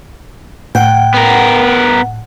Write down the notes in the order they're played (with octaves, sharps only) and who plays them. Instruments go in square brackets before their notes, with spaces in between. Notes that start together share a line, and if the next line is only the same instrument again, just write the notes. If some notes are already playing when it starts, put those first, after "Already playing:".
[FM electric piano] A2 F#5 [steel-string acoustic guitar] G5
[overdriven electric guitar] B3 A#4